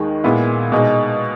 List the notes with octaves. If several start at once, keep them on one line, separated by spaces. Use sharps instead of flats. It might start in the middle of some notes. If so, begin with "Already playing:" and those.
Already playing: D#2 D#3 G#3 D#4
A#2 G#3 B3 E4
B2 G#3 D#4